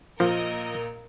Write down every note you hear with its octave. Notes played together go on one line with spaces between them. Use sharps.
A#2 F3 A#4 D#5